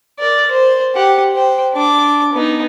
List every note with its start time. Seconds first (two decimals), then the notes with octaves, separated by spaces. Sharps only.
0.19 A#4 D5
0.51 C5
0.95 G4 F#5
1.35 C5 G5
1.73 D4 D6
2.33 B3 D#4